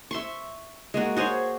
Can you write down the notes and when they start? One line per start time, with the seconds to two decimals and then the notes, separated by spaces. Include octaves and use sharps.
0.11 E5 C6 C#6
0.94 G#3 A#3 F#4
1.16 F#4 G#4 C5 C#5